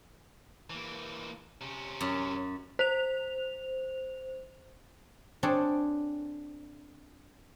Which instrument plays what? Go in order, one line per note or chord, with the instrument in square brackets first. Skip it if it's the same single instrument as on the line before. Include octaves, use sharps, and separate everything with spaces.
[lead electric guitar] E3 A#3
C3 C#4
[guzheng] F#2
[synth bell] C5 F7
[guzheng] C4 D4 G#4 A4 C#5 D5